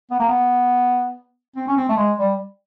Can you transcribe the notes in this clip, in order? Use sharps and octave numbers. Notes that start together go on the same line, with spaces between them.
B3
A#3
B3
C4
C#4
C4
A3
G#3
G3